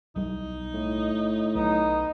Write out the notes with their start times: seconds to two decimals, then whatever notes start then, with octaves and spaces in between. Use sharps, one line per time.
0.16 B1 G3 D#4
0.74 A2
1.55 B1 B3 D#4